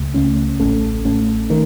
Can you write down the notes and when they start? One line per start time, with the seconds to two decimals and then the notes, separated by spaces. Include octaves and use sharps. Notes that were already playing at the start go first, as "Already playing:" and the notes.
Already playing: C#2 C#3 A3
0.14 C#2 C#3 A3 C#4
0.60 A1 A2 A3 C#4 A4
1.05 A1 A2 A3 C#4 A4
1.50 D#3 A3 D#4 A#4